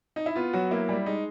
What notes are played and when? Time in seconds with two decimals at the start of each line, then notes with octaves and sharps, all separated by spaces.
0.16 D#4
0.26 E4
0.36 B3 F4
0.53 F#3 F#4
0.71 A#3 E4
0.89 G3
1.06 G#3 D#4